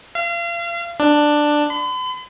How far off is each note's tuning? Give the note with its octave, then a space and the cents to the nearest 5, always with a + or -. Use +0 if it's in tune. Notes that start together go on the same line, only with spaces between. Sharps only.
F5 -35
D4 +10
B5 +45